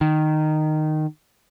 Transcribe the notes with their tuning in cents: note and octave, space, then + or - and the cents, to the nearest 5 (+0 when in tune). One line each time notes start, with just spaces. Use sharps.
D#3 -10